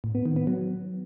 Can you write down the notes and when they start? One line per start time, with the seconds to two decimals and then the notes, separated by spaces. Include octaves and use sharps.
0.04 A2
0.15 B3
0.26 D#3
0.36 B3
0.47 F#3